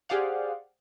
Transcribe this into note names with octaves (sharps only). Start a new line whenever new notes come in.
G4 G#4 C5 D5 F5 F#5